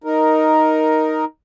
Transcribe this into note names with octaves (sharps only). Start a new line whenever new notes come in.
D#4 A#4